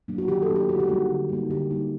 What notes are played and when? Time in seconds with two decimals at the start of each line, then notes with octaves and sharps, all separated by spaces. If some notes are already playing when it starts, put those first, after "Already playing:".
0.08 F#3 A#3 D4
0.18 F#4
0.28 D#3 G4
0.42 A4
0.49 F#3 A#3 D4
0.56 G4
0.69 D3 F#4
0.79 G4
0.89 G3 A#3 D#4 F#4
1.09 D3
1.29 G3 A#3 D#4
1.50 D3 G4
1.70 G3 A#3 D#4